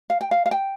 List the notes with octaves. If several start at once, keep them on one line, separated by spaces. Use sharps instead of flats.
F5
G5
F5
F5
G5